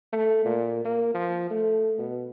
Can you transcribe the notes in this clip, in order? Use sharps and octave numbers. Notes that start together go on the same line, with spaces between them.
A3
A#2
A#3
F3
A3
B2